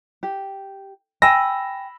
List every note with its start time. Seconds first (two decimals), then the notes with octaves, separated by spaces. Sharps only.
0.23 G4
1.22 G5 G#5 B5 E6 A#6